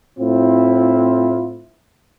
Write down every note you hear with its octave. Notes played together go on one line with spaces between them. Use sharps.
A2 C4 E4 F4